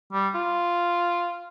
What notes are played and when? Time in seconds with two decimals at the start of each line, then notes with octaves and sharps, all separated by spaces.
0.12 G3
0.35 F4